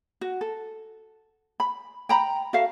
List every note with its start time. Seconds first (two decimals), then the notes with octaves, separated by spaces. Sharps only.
0.21 F#4
0.41 A4
1.60 B5
2.09 G5 A#5 B5
2.53 F#4 A4 E5 F5